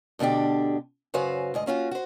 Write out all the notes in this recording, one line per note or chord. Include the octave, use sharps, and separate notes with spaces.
D2 B2 D3 D4 G4
F#2 C#3 F#4 B4 C5 F5
D2 G#2 D#5
A#3 C#4 F4 F#4
F#4 C5